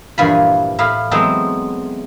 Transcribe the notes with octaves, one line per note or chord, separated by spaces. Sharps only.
G2 A#2 E3 F3 G#5 B5
A2 E4 B4 F5 B5
E3 F#3 G#3 A3 B3 C4